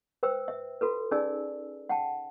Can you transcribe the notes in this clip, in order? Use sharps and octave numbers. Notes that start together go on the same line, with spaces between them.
B4 C5 G5 E6
E5
F4 F#4 A4 B4
C#4 D#4 G#4 D5 G#5 E6
F#5 G5 A5